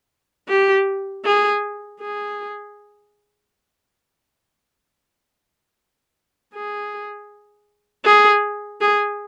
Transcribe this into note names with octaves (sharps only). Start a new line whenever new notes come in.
G4
G#4
G#4
G#4
G#4
G#4